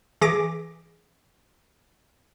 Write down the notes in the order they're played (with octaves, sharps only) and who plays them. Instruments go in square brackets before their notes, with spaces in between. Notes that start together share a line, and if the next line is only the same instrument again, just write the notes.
[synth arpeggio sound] E3 G#4 D6 A#6 B6 D7